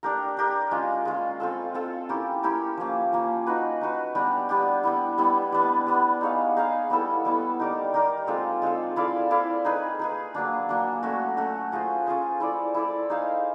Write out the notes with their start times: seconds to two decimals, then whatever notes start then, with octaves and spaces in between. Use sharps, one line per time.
0.03 D4 G4 A#4
0.37 D4 G4 A#4
0.71 G#3 C#4 F4
1.05 G#3 C#4 F4
1.40 C4 F4 A4
1.74 C4 F4 A4
2.09 C#4 E4 G4 A#4
2.43 C#4 E4 G4 A#4
2.77 F3 A#3 C#4
3.13 F3 A#3 C#4
3.47 D#4 F#4 B4
3.81 D#4 F#4 B4
4.15 G3 B3 D4 G4
4.49 G3 B3 D4 G4
4.83 G3 B3 E4
5.18 G3 B3 E4
5.52 G3 B3 D4
5.87 G3 B3 D4
6.21 D#4 G#4 C#5 F5
6.56 D#4 G#4 C#5 F5
6.90 G3 B3 E4 A4
7.25 G3 B3 E4 A4
7.60 D#4 G4 A#4 D5
7.94 D#4 G4 A#4 D5
8.27 G#3 C4 F4 A4
8.62 G#3 C4 F4 A4
8.96 E4 A4 D5 F5
9.30 E4 A4 D5 F5
9.65 D#4 G#4 B4
9.99 D#4 G#4 B4
10.35 F#3 A#3 D4
10.69 F#3 A#3 D4
11.03 A3 C#4 F#4
11.37 A3 C#4 F#4
11.72 C#4 F4 G#4 C5
12.06 C#4 F4 G#4 C5
12.40 E4 A4 D5
12.74 E4 A4 D5
13.10 D#4 G#4 C5 F5